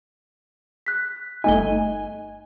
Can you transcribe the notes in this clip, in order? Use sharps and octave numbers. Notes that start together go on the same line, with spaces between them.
F#6 B6
G1 A3 D#4 D#5 G#5 G7